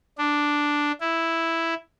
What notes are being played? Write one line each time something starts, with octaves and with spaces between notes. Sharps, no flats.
D4
E4